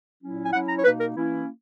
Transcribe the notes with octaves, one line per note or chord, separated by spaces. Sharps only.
A#2 F#3 C#4 E4
G#5
F#3 C#4 E4 F#5
A#5
C#5
B2 A#3 D#4 B4
A#4
E3 A#3 C#4 E4